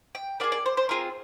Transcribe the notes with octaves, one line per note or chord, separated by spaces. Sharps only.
G5
A#3 F4 G#4 D5
D5
C5
C5
C4 F4 G#4 A#4